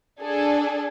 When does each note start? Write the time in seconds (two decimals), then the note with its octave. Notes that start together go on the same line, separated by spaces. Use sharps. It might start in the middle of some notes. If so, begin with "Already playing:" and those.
0.22 D4 G#4 A4